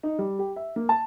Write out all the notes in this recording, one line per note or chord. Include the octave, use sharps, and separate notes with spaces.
D#4
G3
G4
E5
A#3
A5